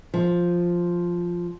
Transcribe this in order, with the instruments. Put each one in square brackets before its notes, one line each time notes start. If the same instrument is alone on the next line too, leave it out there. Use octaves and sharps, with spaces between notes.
[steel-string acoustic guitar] F3